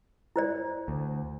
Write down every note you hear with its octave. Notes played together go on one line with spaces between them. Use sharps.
E4 C5 D5
D2